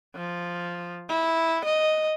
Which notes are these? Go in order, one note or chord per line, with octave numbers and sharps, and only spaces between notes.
F3
E4
D#5